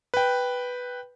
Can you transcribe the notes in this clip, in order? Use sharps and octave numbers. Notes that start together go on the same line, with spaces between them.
B4 G5